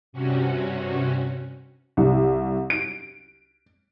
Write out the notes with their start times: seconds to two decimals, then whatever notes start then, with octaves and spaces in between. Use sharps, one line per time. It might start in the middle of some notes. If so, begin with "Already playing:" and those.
0.12 G2 C3 C#4 F#4
1.97 C2
2.70 D7